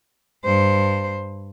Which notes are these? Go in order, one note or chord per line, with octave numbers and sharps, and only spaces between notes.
G2 C5